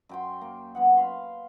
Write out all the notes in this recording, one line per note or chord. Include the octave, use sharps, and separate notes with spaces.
F#2 G5 C6
A#3
F#2 B3 F#5
F5 B5 C6